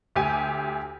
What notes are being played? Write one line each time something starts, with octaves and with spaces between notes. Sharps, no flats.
D2 G4 G#5 D#7